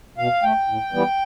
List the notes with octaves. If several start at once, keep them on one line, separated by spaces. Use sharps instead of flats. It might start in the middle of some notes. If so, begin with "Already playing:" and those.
B2 F5
A3 G5
A2
E3 G3 B3